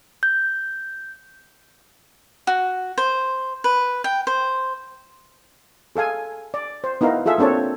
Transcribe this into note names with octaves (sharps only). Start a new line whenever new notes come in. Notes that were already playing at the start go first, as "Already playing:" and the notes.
G6
F#4
C5
B4
G5
C5
G#4 A4 F5 G#5
D5
C5
B3 D#4 E4 A#4 F5
F4 G#4 A4 E5 F5
A#3 C4 D4 A4 C#5